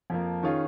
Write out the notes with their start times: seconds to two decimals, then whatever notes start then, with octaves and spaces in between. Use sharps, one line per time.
0.10 F2 F3 A#3
0.43 D#3 C#4 F4 G#4